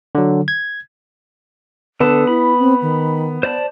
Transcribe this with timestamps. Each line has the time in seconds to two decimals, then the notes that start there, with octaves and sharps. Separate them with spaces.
0.15 D3 F#3
0.48 G#6
2.00 D3 B3 A4 A5
2.27 E4 B5
2.59 C4
2.82 D#3
3.43 C5 D5 A5